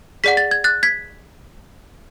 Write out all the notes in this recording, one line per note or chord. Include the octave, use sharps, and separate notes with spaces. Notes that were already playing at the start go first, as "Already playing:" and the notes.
G#4 D5 F#5 B6
A6
G#6
F#6 A6
G#6 B6